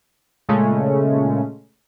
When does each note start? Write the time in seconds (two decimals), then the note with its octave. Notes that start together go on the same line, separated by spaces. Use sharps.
0.49 A#2 C#3 G#3 A3 C#4